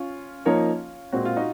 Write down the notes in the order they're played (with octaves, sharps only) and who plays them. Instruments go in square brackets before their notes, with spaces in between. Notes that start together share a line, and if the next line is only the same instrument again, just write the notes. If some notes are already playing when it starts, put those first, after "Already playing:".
Already playing: [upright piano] C#4 F4
[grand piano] F3 A#3 D#4 A#4 C#5
[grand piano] A#2 G#3 C4 [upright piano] F#4
[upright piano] F4
D#4 F#4